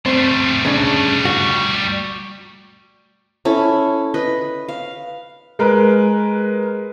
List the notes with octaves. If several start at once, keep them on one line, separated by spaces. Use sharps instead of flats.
G3 A3 C4
C#3 D4
F#4
C#4 E4 A4
B4 D#5
F5
G#3 A#4 B4